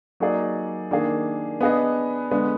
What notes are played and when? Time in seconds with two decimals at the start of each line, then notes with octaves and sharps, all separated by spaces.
0.20 F#3 A#3 D#4 G#4 D5
0.91 D#3 A#3 D4 G#4
1.61 B3 D4 G#4 B4 D#5
2.31 D3 G#3 B3